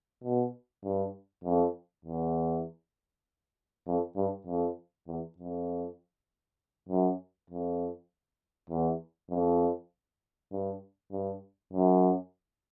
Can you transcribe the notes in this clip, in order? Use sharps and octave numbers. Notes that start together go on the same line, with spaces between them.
B2
G2
F2
E2
F2
G2
F2
E2
F2
F#2
F2
E2
F2
G2
G2
F#2